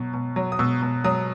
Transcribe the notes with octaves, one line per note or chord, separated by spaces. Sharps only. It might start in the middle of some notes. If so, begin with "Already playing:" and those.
Already playing: B2 F#3
B2
F#3
D#6
B2 E6
B2
F#3 D#6